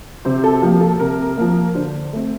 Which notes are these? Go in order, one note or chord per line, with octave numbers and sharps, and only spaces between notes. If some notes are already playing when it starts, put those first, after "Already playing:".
C3 C5
A4
F3 A#3 G4
A4
C3 A#4
F3 A#3
D3 C5
A3 C4